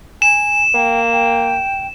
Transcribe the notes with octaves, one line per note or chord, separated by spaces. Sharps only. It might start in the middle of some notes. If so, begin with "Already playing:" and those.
G#5 E7
A#3 G5
G5